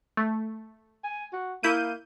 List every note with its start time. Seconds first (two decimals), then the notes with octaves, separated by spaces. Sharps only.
0.17 A3
1.04 G#5
1.33 F#4
1.63 A#3 E4 G6 D#7